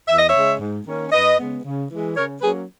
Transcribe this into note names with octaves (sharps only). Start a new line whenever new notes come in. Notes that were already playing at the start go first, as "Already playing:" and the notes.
E2 E5
D#5
C#5 E5
C#3 G#3
G#2
D#3 A#3 C#4
F#2 B4 D#5
C#3 G#3 B3
C#3
E3 G#3
C#3 A#4 C#5
F#3 A#3 C#4 G#4 B4